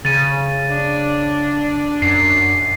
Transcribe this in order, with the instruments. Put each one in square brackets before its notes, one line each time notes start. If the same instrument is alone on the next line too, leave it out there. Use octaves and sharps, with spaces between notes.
[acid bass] C#3 [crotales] A6 D#7
[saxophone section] D4
[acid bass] F#2 [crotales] C7